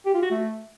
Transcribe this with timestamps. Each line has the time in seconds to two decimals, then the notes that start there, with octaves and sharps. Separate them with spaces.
0.05 G4
0.14 F4
0.23 F#4
0.31 A3